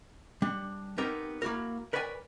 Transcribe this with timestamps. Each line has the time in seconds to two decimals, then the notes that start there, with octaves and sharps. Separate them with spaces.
0.42 G3 D4
0.98 B3 C4 D#4 G4 A#4
1.42 A#3 E4 F#4 A#4
1.93 A#4 B4 C#5 D5 G5 G#5